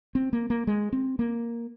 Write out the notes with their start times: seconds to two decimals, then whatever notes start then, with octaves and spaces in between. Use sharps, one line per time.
0.15 C4
0.33 A#3
0.50 A#3
0.67 G#3
0.93 C4
1.19 A#3